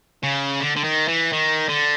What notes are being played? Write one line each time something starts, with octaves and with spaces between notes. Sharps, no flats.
C#3
D3
D3
D#3
E3
D#3
D3